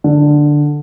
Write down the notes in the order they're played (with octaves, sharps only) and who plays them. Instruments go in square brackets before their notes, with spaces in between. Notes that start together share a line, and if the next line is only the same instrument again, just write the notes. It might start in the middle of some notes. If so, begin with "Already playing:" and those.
[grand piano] D3